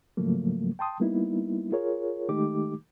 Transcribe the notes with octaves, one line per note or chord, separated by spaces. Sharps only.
G#2 C#3 F3 F#3 A3 A#3
G5 A5 C6 D#6
G3 A#3 B3 D#4 E4
F4 G#4 A#4 C#5
D#3 G#3 A3 D#4 G4 D6